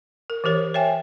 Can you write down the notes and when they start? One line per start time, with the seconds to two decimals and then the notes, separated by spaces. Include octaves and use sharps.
0.30 A#4
0.44 E3 G4 A#4 C#5
0.74 C#5 E5 G5 G#5